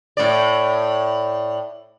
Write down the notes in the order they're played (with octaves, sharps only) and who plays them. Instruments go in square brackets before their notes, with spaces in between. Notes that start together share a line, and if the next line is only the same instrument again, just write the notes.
[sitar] A2 D5